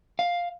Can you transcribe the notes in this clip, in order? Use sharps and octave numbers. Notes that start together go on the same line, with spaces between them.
F5